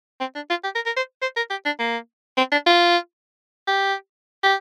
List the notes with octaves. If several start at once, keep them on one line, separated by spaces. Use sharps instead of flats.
C4
D4
F4
G4
A#4
A#4
C5
C5
A#4
G4
D4
A#3
C4
D4
F4
G4
G4